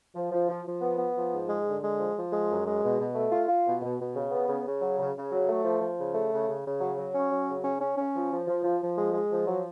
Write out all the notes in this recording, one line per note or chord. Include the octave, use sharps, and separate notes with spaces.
F3
F3
F3
F3
B3
B3
F3
G#2
G#3
D3
G#3
F3
F3
G#3
F#2
G#3
B2
B2
A3
F4
F4
B2
B2
B2
C#3
B3
C#3
C#3
F#3
C#3
C#3
F#3
A3
F3
F3
C#3
A3
C#3
C#3
C#3
F#3
F#3
C#4
F#3
C#3
C#4
C#4
C#4
F3
F3
F3
F3
F3
G#3
G#3
F3
F#3